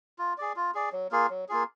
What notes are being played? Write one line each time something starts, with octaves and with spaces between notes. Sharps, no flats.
F4
G#4 D5
F4
G#4 D5
F#3
A#3 F4 G#4
F#3
A#3 F4 G#4